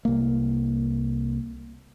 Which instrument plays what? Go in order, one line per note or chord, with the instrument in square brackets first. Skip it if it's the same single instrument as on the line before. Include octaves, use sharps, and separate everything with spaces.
[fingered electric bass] C2 A#3